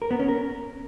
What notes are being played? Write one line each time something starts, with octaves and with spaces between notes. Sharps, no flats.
A#4
B3
C#4
A#4